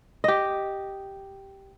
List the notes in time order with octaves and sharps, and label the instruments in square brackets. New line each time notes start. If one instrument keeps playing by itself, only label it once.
[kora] G4 D#5